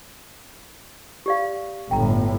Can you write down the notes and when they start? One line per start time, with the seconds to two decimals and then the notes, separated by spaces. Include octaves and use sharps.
1.26 G4 D5 F5
1.91 G1 A2 G5 A#5